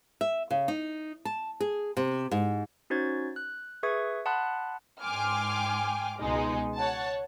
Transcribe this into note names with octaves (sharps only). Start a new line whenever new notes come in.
E5
C#3
D#4
A5
G#4
C3
G#2
C#4 D#4 F#4 C5 G#6 A6
F#6
G#4 B4 E5 C#6 D#6 G#6
F#5 A5 B5 C6 D#6 F#6
G#2 G5 G#5 C6 D6 F6
C#2 B2 G#3 D#4
C#5 F#5 A5